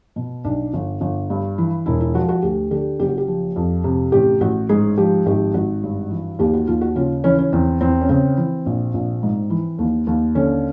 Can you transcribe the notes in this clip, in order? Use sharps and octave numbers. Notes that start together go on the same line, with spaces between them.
B2
B1 D4
G1
G1
G2
E3
E1 E4
E4
F3 F#4
F#4
D2 G4
D3 G4
F#1 G4
F#4
G4
F3
F2
C3
A1 G4
A1 F#4
G#2 G#4
F3 G4
G#1 G4
G#1 F#4
G2
E3
D#2 G4
F#4
D#2 F4
F#4
C#3 F4
E3 C#4
C#4
E2 C4
E2 C4
C#4
C#3 C4
E3
A#1
A#1
G#2
E3
D#2
D#2
D3 C#4